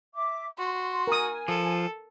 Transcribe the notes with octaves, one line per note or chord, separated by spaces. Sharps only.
E5 D6
F#4 C6
A#4 G#5 D#6
F3 A4